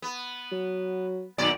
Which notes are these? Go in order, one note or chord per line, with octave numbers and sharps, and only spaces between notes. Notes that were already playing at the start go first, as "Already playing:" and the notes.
B3
F#3
B1 A#2 D#3 D5